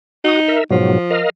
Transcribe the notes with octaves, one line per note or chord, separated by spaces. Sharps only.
D#4 F#4 D#6
A#4 E5
G#2 B2 F3 F#3
A#4 D#5 F5